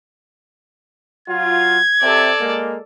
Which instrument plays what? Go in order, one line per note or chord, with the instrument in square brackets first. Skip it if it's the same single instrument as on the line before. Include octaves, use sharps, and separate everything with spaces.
[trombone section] F#3 F4 [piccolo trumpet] G#6
[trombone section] C3 [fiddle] A4 D5
[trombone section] G#3 A#3